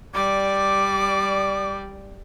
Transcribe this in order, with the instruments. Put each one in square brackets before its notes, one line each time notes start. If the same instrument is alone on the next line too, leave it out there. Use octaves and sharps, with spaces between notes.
[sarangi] G3 [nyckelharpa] D5 [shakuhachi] D6